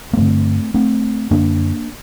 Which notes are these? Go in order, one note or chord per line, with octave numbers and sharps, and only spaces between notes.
A#3
G2 D3 A3 C4
A3 C4
F#2 D3 A#3 D4